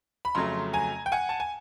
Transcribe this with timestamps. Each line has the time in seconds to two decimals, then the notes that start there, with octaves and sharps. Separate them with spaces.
0.25 B5
0.35 F2 C#3 F#3 A3 A#5 C6
0.73 G#5 A#5
1.06 G5
1.12 F#5 G#5
1.29 A5
1.40 G#5